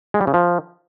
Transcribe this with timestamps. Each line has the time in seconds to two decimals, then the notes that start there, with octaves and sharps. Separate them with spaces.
0.14 G#3
0.21 G3
0.27 C#3
0.34 F3